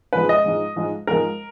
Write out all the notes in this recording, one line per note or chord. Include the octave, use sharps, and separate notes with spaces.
G#2 F3 G#3 B4
D#5
G#2 F3 G#3
G#2 F3 G#3
G#2 F3 G#3 A#4